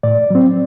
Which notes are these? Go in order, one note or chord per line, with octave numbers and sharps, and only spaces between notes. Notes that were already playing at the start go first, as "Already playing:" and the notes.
A2 D5
F#3 C4